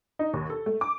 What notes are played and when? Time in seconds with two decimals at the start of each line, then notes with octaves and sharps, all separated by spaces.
0.19 D#4
0.33 D#2
0.50 A4
0.66 A3
0.81 D6